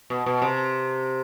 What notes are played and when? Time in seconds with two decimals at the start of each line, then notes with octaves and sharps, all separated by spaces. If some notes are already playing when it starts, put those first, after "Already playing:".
0.10 B2
0.26 B2
0.42 C3